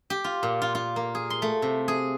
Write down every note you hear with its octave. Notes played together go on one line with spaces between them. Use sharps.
G4
F4
A#2
F4
F4
A#3
G#4
C6
A3
C3
G#4